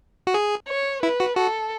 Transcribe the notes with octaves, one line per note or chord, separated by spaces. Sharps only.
F#4
G#4
C#5
E4 B4
F#4
F#4 A4